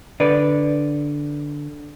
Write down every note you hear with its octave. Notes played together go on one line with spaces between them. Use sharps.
D3 B4 D5